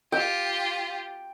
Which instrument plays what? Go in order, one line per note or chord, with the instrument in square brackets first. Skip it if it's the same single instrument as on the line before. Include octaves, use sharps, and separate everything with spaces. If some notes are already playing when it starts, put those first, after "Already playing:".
[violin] F4 G4 [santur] G5